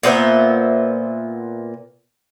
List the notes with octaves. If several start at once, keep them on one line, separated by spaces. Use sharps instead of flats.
A#2 B3 C5 E5